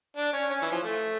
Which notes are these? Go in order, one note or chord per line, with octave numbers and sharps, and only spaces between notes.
D4
C#4
C#4
E3
F3
A3